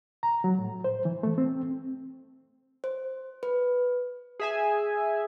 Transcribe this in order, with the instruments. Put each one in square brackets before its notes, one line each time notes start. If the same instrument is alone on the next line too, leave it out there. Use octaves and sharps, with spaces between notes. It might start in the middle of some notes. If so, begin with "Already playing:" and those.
[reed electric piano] A#5
F#3
A2
C5
E3
A3
C4
[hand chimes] C5
B4
[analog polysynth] G#4 E5 G#5